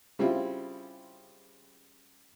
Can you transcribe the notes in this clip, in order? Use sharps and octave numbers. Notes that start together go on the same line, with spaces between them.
C#3 G3 C4 E4 F4